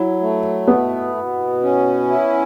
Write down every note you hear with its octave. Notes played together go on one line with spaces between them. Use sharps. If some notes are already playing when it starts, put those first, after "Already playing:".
Already playing: F#3 E4
A3
B2 B3
B2
C#4
E4